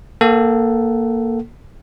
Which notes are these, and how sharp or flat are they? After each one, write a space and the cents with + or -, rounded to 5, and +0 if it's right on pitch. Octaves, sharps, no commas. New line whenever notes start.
A#3 +0 A4 +0 F#5 +40